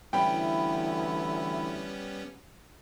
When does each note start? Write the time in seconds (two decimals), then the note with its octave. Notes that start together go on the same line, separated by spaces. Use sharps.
0.13 D2 E3 G3 B3 C#4 E4 G5 B5